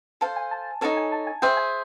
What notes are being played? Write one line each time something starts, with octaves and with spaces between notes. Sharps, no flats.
A4 C5 F5 A5
G#5
A5
D#4 F#4 A4 C#5 A5
G#5
A5
G#5
G#4 C5 E5 G5
G#5